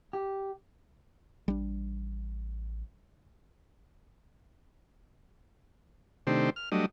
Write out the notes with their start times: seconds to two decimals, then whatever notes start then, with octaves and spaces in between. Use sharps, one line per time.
0.13 G4
1.48 A1 G3 D4
6.27 C3 D#3 A3 D4 G4 C5
6.56 F6
6.72 F#3 G3 A3 D4 D#5